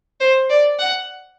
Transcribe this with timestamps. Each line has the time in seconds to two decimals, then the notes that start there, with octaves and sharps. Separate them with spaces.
0.20 C5
0.50 D5
0.79 F#5